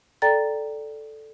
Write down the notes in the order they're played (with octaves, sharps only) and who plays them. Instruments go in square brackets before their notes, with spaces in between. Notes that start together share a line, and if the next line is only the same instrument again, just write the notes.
[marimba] A4 D5 G5 A#5 A6